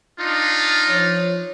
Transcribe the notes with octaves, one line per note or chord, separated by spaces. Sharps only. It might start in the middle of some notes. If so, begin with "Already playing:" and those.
D4 D#4 F4
F3 C#5